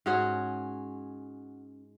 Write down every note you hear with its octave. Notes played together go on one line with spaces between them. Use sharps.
G#2 C#4 F#4 G#4